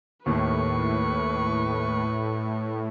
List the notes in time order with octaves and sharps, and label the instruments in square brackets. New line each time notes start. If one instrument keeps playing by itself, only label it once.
[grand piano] D#2 [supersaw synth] A2 [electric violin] B4 C#6